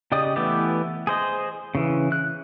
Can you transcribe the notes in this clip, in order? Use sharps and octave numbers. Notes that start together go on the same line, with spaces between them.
C#3 G4 D5 D#5 D#6
E3 A3 B3 G4 D5
G#4 C5 D#5
C#3 E3
F#6